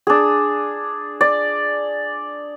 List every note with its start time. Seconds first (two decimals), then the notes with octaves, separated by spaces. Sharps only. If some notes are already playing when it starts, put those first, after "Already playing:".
0.07 D4 G#4
1.21 D5